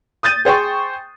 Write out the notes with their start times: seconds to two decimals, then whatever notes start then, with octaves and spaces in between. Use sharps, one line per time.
0.23 D#6 G6 A6 D#7
0.45 G#4 C5 G5 C#6